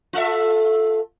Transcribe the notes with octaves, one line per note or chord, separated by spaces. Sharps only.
F4 A4 E5